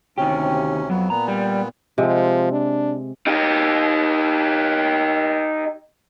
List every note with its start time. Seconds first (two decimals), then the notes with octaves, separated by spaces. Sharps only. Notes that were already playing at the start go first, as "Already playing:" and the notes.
0.18 D2 C3 D#3 C#4 G4
0.90 F2 F#3 B3
1.10 A#2 B3 A#5
1.28 G3
1.98 C3 F3 G#3
2.52 D4
3.27 D#4 G4